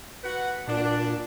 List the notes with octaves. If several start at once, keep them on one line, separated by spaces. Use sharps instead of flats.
F#4 B4 F#5
A#2 D4